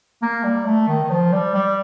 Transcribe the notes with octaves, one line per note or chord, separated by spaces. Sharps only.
A#3
G3
A3
D#3
D#3
F3
G3
G3